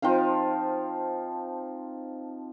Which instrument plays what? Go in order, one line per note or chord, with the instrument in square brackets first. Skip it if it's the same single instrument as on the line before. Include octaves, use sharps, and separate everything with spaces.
[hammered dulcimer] F3 C4 D#4 F5